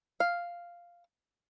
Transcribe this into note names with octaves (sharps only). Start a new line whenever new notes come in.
F5